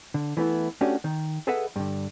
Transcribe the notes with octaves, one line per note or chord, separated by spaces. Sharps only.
D3
E3 A3 B3 E4
A3 C#4 D4 F#4 G4
D#3
G#4 A4 B4 D#5 E5 F#5
G2 D3